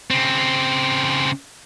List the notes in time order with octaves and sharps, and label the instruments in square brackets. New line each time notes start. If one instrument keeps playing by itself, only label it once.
[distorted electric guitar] C#3 C4